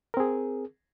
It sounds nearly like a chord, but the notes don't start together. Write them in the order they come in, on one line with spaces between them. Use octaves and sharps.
A#4 C4 G#4